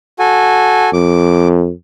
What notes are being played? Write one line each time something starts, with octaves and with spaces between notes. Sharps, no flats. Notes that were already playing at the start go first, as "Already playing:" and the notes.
F#4 A4 G#5
F2 D6